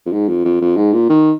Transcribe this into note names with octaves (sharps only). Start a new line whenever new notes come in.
F2
G#2
F2
F2
F2
G#2
A#2
D#3